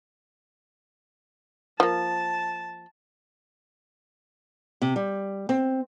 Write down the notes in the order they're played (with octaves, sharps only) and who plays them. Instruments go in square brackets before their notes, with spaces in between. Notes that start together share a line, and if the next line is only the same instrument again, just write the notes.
[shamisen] F3 A#3 [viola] A5
[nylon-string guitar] C3
G3
C4